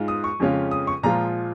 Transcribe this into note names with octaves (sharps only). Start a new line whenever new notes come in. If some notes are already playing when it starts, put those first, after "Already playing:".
Already playing: G#2 G#3 F4
D#6
C#6
F2 C#3 G#3 C#4 F4
D#6
C#6
A#2 F3 G#3 F4 A#5